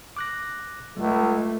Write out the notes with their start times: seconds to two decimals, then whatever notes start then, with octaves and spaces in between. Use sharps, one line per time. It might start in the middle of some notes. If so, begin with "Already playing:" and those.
0.17 D6 F#6 A#6
0.97 C#2 G3 A3